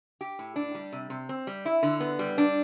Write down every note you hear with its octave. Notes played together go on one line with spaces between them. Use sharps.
G4
A2
D4
G3
C3
C3
C4
G3
E4
D3
B3
G3
D4